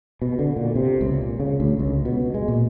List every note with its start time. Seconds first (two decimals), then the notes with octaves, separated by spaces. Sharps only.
0.22 B2
0.39 D3
0.56 A#2
0.75 C3
1.01 C#2
1.13 A#2
1.40 C#3
1.60 D2
1.79 C#2
2.05 B2
2.34 G#3
2.48 A#2